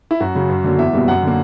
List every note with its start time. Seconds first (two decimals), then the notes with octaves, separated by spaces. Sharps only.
0.11 E4
0.20 F#2 F#4
0.35 C#3 F#3
0.49 F#2
0.64 D3 F#3 A#3
0.79 E2 E5
0.93 B2 G3 A#3
1.08 F#2 F#5
1.23 D3 A#3